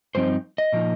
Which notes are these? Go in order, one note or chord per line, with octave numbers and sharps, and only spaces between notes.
G2 F3 C4 D#4 C5
D#5
A#2 F3 A#3 D#4